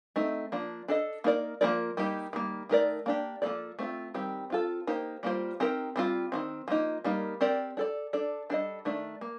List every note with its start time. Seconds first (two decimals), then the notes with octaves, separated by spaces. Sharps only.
0.16 A3 C4 D#4
0.52 F3 A#3 D4
0.88 D4 A4 D#5
1.24 A#3 D#4 A#4 D5
1.61 F3 A#3 D#4 A#4 D5
1.97 G3 A#3 D#4 G4
2.33 D#3 G3 A#3
2.69 D#3 A3 D#4 A#4 D5
3.06 A#3 D4 G4
3.42 F3 A#3 D4 A4 D5
3.79 A3 C4 F4
4.14 D#3 G3 C4 G4
4.50 C4 F4 A4
4.87 A#3 D#4 G4 C5
5.23 G3 A#3 F4 C5
5.60 C4 D#4 G4 A#4
5.96 G3 C4 F4
6.32 D#3 A3 C4
6.68 F3 A#3 D#4
7.04 G3 A#3 D#4 A#4
7.41 C4 G4 A#4 D5
7.77 D4 A4 D5
8.13 D4 A4 D5
8.50 G3 D4 A4 C5 D#5
8.85 D#3 A3 D4
9.21 A#3